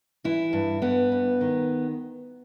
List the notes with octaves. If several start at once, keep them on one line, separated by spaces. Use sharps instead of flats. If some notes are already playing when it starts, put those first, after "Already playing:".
E3 E4
G2
G2 B3
G2
D#3